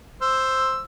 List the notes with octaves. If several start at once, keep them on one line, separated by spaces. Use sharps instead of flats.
C5 E6